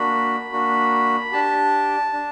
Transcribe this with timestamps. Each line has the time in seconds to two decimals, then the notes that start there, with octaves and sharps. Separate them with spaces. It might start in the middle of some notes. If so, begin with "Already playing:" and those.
Already playing: A#3 D4 F#4 B5
0.52 A#3 D4 F#4
1.32 D4 G4 A5
2.13 D4